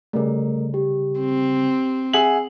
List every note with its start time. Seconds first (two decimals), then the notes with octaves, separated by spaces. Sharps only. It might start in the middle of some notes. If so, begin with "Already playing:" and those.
0.13 C#3 G3 A3 A#4
0.74 G4
1.20 C4
2.13 G#4 E5 F#5 E6 F#7